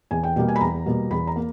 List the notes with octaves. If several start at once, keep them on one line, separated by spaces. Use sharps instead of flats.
E2 G#5
G5
B2 G3 A#3 G5
G#5
B5
E2 A#5
B2 G3 A#3
E2 B5
A#5
A#3